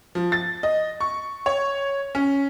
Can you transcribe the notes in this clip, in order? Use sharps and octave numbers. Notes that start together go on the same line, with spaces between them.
F3
A6
D#5
C#6
C#5
C#4